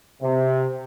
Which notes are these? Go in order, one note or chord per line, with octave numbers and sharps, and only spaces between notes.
C3